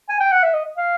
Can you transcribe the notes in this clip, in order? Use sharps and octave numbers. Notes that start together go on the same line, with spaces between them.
G#5
G5
F#5
E5
D#5
F5